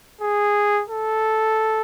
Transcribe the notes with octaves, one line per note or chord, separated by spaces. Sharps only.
G#4
A4